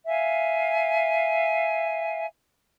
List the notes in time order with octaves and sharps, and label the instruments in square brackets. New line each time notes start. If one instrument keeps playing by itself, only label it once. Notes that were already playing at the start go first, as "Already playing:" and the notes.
[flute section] E5 F5 G#5